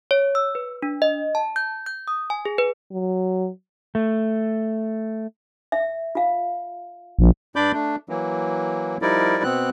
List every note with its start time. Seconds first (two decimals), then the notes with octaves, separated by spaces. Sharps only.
0.11 C#5
0.35 E6
0.55 B4
0.82 D4
1.02 D#5
1.35 A5
1.56 G6
1.86 G6
2.08 D#6
2.30 G#5
2.45 G#4
2.58 B4
2.92 F#3
3.95 A3
5.72 E5
6.15 F4 F5
7.19 A#1
7.56 G2 D4 D5 B5 D6 G6
7.73 A3 D4
8.09 E3 F#3 A#3
9.02 F3 G3 D#4 E4 A#4 D5
9.43 B2 B3 C4 F#6